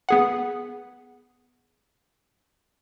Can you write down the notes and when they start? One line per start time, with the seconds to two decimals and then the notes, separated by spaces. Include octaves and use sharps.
0.09 B3 G#4 F#5